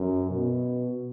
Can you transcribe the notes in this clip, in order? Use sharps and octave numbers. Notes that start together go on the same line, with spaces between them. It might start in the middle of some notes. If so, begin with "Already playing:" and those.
Already playing: F#2
B2